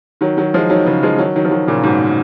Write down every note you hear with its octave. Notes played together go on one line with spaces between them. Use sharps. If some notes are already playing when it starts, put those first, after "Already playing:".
D#3 F#3
D#3 F#3
F3 G#3
D#3 F#3
C#3 F3
F3 G#3
D#3 F#3
D#3 F#3
F3
D#3 F#3
A#2 C#3
G#2 B2